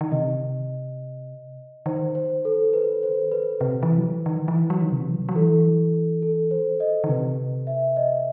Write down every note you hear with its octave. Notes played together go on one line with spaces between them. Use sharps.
D#3
C3 D#5
D#3 C5
C5
A4
B4
C5
B4
C3 B4
E3
F#3
E3
D#3
E3
F#3
D#3
C3
E3
F#3
F#3
E3 A4
A4
C5
D#5
D#3
C3 B4
E5
D#5